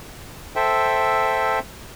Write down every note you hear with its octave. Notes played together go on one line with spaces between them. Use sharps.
A4 C5 E5 G5